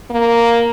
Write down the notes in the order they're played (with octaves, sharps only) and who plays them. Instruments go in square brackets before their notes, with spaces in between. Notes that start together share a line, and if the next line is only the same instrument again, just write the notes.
[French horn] A#3